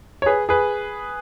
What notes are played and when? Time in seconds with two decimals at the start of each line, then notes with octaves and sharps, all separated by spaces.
0.22 C#5
0.26 G#4 B4
0.49 G#4 B4